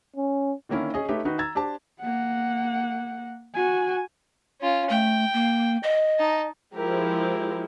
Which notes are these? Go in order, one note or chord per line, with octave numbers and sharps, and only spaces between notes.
C#4
D3 D#3 A#3 C#4 E4
C#4 G#4 D#5
A3 D#4 G4 B4 C#5 E5
D#3 D#4 F#4 B4
A#5 E6 G#6 A6
D4 G4 C5 A5
A#3 F#5
F#4 G#5
C#4 F4
A3 G5
A#3
D#5
D#4 A5
F3 G#3 E4 G4 A#4